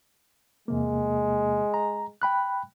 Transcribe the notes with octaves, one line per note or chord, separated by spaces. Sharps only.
E2 C3 G#3 A#3
A#5
G5 B5 F#6